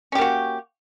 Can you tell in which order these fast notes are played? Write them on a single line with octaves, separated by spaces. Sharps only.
C#4 G4 A#3 F#4